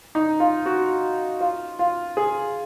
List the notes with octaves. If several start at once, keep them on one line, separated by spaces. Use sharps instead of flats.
D#4
F4
F#4
F4
F4
G#4